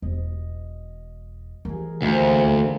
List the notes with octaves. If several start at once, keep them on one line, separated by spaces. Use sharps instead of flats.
E1 D#5
E3 G#4 A#4
D2 A#2 D#3 F3
E3